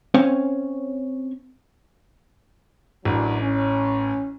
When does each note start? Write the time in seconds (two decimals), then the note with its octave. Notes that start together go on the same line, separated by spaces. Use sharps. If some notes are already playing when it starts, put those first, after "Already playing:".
0.14 C4 C#4 C5 C#5 F5 G#5
3.05 A1 F#2 F#3 D4
3.41 C#4